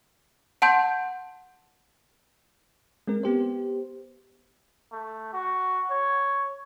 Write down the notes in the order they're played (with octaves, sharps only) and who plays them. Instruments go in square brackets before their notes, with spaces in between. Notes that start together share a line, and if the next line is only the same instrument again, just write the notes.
[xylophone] F#5 A5 C6 G6
[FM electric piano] G#3 C4 A#4
B3 G4 C5
[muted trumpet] A3
F#4
C#5